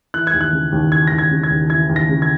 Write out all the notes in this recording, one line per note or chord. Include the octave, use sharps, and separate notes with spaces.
E3 F#6
G#6
D#2
F#6
C#3
D#2
E3 G#6
D#2 A#6
G#6
C#3
G#6
D#2
E3 G#6
D#2
A#6
C#3
G#6